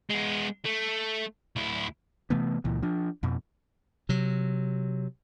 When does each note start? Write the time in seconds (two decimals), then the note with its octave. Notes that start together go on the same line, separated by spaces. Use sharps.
0.10 G#3 B3
0.65 A3
1.56 D2 E4
2.30 C3 E3 A3 B3
2.64 C#2 A#2 E3
2.83 F3 D4
3.23 F2 B2
4.09 C3 F#3